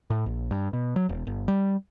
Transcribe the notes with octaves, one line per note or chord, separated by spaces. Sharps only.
A2
A#1
G2
B2
F#3
E1
G1
G3